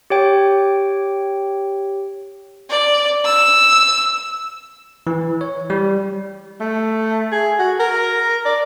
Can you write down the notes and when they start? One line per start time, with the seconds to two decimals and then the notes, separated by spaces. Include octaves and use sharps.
0.10 G4 C#5 G5
2.70 D5
3.25 E6
5.07 E3
5.41 C#5
5.70 G3
6.60 A3
7.32 G#4
7.58 F#4
7.79 A#4
8.45 D5